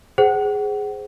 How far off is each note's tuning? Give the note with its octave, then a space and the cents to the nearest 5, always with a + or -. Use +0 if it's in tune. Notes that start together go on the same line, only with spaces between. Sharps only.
G#4 +0 C5 +0 F#5 +25